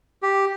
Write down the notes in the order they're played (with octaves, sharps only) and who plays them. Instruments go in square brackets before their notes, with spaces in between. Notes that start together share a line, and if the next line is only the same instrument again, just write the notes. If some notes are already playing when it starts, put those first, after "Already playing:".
[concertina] G4